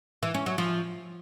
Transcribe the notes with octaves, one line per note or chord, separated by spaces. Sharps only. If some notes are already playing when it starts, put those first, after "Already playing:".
E3
C#4
F#3
F3